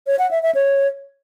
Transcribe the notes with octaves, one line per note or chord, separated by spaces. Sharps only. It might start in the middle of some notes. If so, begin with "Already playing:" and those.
C#5
F#5
E5
E5
C#5